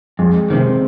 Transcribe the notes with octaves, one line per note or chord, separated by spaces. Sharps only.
F2 G#3
C3 D#3 C4